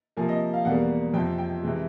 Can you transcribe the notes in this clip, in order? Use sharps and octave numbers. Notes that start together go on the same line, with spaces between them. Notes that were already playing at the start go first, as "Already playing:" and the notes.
C3 F3 A#3 G#5
D#5
F5
E2 B2 G3 A#3 F#5
F2 C3 F3 G5
G5
C3 E3 G#3